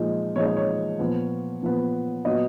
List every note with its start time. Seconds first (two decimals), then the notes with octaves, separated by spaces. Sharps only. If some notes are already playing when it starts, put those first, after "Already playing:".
Already playing: A#2 F3 G#3 D#4
0.36 A#2 F3 G#3 D#4 C#5
0.46 D#5
0.57 C#5
0.99 A#2 F3 B3
1.63 A#2 F3 B3
2.25 A#2 F#3 B3 D#5